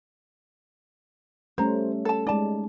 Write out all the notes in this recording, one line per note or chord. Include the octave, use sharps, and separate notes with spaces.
G3 A3 C#4 C5 A#5
A4 A5
G#3 D#4 D5 A5